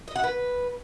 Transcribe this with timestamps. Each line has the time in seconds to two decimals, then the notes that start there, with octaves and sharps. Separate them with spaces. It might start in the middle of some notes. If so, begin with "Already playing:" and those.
0.08 D#5
0.16 F#5
0.24 B4